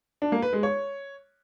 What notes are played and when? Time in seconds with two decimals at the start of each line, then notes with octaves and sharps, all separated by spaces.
0.22 D4
0.32 A#3
0.42 B4
0.53 G#3
0.63 C#5